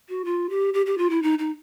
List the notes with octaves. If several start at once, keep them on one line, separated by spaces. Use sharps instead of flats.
F#4
F4
G4
G4
G4
F4
E4
D#4
D#4